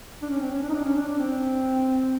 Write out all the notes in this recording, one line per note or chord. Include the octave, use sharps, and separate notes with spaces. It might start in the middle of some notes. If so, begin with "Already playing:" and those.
D4
C#4
C4
C#4
D4
D#4
D4
C#4
D4
D4
C4